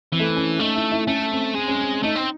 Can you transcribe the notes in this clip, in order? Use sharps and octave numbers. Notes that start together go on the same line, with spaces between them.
E3 C4
A3
C4
C#4
A3 D#4
E4
E4
A3 C#4
C4
G#3 C4
C#4
C4
A3 D#4
C4